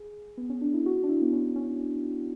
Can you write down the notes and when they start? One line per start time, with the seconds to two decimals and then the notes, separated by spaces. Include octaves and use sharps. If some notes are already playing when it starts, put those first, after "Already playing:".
Already playing: G#4
0.38 B3
0.49 C#4
0.61 D4
0.74 E4
0.86 F#4
1.03 D4
1.09 E4
1.22 B3
1.33 C#4
1.56 C#4